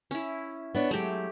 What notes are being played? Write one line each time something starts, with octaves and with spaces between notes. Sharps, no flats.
C#4 E4
B3 D4 C#5
F#3 G#3 A3 G4